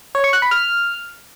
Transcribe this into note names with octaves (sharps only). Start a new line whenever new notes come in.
C#5
C#6
F#6
B5
F6